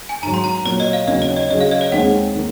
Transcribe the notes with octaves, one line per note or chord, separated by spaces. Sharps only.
G#5
G#2 D#3 F#3 A#5
C6
A#5
A#2 F#3 A#3 C#5
D#5
F5
D#2 C#3 F#3 D#5
C#5
D#5
C#3 F#3 C#4 G#4 D#5
F5
D#5
C#5
D#2 D#3 G#3 C4 F#5
D#3 A#3